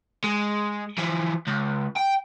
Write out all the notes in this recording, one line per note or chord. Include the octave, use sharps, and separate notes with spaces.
G#3
E3 F3
C#2
G5